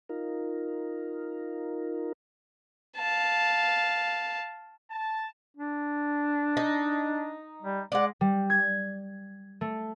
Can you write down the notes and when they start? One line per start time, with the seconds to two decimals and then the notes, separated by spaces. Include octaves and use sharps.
0.09 D#4 F4 A#4
2.98 F5 A5
4.91 A5
5.57 D4
6.57 D#4
7.63 G3
7.92 G#3 D5 F#5
8.21 G3
8.50 G#6
9.61 A3